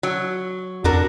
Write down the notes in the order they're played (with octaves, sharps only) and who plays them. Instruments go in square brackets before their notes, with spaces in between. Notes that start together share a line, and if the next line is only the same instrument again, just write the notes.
[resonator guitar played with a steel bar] F#3
[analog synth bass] F2 [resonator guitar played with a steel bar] D4 F#4 A#4